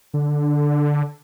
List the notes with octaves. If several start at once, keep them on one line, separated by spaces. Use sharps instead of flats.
D3